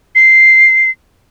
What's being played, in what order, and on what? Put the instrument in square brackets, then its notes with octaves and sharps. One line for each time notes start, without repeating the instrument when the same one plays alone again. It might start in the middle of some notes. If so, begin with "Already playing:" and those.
[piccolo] C7